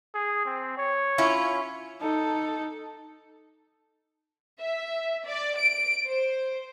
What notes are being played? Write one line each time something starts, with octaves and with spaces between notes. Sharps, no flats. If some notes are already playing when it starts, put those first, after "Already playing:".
G#4
C4
C#5
C#4 E4 F4
D#4 A4
E5
D5
D7
C5